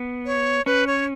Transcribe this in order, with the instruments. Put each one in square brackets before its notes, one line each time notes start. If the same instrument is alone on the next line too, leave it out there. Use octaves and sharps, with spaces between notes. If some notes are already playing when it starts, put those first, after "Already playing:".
Already playing: [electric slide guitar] B3
[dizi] C#5
[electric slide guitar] C#4 [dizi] B4
[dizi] C#5